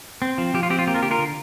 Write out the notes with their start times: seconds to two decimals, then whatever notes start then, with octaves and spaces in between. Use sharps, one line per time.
0.22 C4
0.38 F3
0.54 F3 G4
0.63 F4
0.70 C4 G4
0.79 F4
0.87 A#3 G4
0.94 F4 A#4
1.03 D3 G4
1.11 F4 A#4
1.19 D3